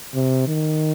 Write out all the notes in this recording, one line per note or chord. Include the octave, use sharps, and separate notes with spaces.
C3
D#3